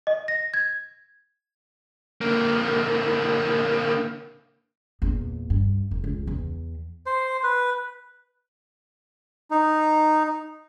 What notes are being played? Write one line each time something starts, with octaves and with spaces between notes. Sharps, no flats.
D#5
A#6
G#6
D3 A#3
E2 A#2
G2
E1
C#2
E2
C5
B4
D#4